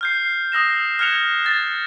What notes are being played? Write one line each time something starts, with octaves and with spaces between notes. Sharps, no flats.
F6 G6 C7
D#6 E6 A#6 E7
F6 F#6 G#6 C#7 E7 F7
G#6 A6